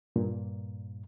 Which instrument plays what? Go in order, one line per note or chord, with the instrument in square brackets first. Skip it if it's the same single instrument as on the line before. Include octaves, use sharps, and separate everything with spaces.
[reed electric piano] G2 A#2